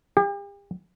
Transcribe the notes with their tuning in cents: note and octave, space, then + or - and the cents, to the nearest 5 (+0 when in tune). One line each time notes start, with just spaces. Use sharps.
G4 +40